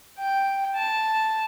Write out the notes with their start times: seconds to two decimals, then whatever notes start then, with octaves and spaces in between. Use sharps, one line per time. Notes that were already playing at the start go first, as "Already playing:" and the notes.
0.18 G5
0.75 A5